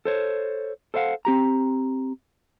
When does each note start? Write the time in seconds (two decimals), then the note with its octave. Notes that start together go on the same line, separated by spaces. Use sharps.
0.05 A4 C5 C#5
0.94 A4 C5 D#5 F5 F#5
1.25 C4 G4 A#5